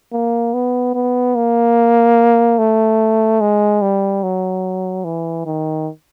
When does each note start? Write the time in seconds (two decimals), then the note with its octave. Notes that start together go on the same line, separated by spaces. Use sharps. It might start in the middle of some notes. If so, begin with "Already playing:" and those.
0.13 A#3
0.54 B3
0.95 B3
1.36 A#3
2.59 A3
3.41 G#3
3.82 G3
4.23 F#3
5.05 E3
5.46 D#3